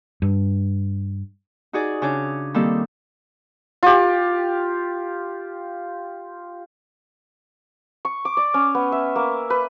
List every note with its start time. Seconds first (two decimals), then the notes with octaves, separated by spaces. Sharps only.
0.22 G2
1.73 D#4 F#4 G#4 D5
2.02 C#3 D4 C#5 D6
2.54 D#3 G3 A#3 C4 G4 A4
3.83 F4 G4
8.05 C#6
8.25 D6
8.37 D5
8.54 C#4
8.75 B3
8.92 E5
9.16 A#3
9.50 B4